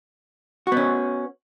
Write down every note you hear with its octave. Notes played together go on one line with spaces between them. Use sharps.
B3 C#4 F#4